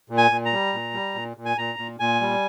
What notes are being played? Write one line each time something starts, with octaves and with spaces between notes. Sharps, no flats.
A#2
G#5
A#2
A#5
G3
A#2
G3
A#2
A#2
G#5
A#2 A#5
A#2
A#2 G#5
G3